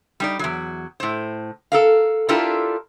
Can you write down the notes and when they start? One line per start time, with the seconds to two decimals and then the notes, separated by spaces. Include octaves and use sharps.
0.20 G3 D#4 D5
0.39 E2 F#3
1.00 A2 C5
1.72 A4 A#4 F5
2.29 D4 E4 F4 G4 A4 A#4